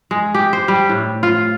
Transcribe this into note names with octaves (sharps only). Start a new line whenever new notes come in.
G#3
G4
C5
G3
A2
F4